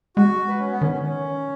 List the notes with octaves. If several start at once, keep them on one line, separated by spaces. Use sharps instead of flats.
G#3 F#4
B4
C#4
B3
D#3 C#4
C#4
C#4